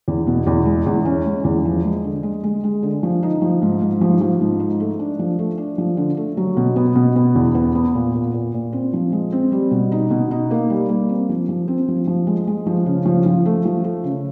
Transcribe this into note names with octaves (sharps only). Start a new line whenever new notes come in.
E2
B2
E2
G#3
E2
C#4
G#3
E2
F3
G#3
D3
G#3
G#3
G#3
D3
F3
D#4
F3
G#2
G#2
F3
F3
G#2
D#4
A3
D4
F3
A3
D4
F3
D3
A3
F#3
B2
B3
B2
B3
E2
B3
B3
A#2
A#2
A#2
A#2
C4
F3
G#3
C4
G3
B2
D#4
B2
D#4
A#3
G3
A#3
C4
F3
F3
C4
F3
F3
G#3
G#3
F3
C#3
F3
F3
A3
F3
A3
C#3